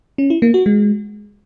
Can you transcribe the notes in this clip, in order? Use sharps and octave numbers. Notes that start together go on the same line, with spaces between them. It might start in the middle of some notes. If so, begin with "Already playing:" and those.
C#4
E4
A#3
F#4
G#3